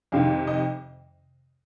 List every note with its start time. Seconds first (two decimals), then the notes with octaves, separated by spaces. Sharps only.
0.12 F2 C3 D#3 F5
0.47 D#5